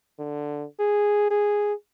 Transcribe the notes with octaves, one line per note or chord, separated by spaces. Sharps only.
D3
G#4
G#4